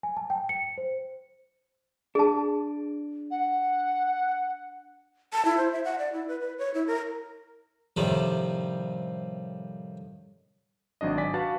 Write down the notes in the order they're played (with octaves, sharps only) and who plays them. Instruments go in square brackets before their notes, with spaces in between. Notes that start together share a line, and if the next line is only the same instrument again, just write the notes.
[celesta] G#5
A5
G5
C#7
C5
[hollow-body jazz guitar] D4 [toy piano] G#4 A5
[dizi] F#5
[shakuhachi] A5
E4
C5
E5
F#5
D5
E4
B4
B4
C#5
E4
A#4
[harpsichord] A2 C3 D#3 F3 G3
[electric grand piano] G#1 F#3 D4 D#5
D5 G#5 B6
F#4 B4 F5 F#5 A5 A6